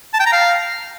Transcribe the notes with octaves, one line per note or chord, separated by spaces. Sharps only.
A5
G5
A#5
F5